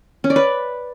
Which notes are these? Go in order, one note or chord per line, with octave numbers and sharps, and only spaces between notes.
C#4
D5
B4